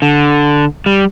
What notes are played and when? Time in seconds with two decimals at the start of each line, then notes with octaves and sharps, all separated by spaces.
0.02 D3
0.86 G3